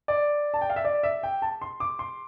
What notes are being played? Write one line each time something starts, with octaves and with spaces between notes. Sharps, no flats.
D5
A5
G5
F5
E5
D5
E5
G5
A5
C6
D6
C6